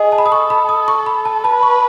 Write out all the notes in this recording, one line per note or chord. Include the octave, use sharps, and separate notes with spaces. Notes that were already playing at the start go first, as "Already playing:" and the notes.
Already playing: G#4 D#5
A5
B5
D#6
A4 C#6
B5
D#6
C#6
B5
A5
B4 A5
C#6